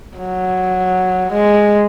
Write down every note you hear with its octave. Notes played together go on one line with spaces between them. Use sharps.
F#3
G#3